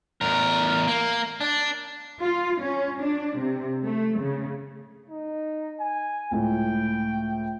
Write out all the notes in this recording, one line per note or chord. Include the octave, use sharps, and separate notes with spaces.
E2 A#4
A#3
D4
F4
C#4
D4
C3
A3
C#3
D#4
G#5
C#2 A2 G5